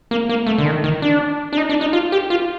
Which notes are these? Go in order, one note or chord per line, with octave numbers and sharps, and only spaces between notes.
A#3
A#3
A3
D3
D#3
D#3
D4
D4
D#4
D4
D#4
F4
G4
F4